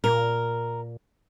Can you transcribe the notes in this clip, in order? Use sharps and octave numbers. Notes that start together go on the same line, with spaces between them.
A#2 A#4